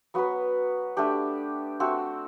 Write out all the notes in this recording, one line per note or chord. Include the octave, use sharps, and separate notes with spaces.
F#3 B3 F#4 B4
A3 D4 G4 D5
A3 C4 F#4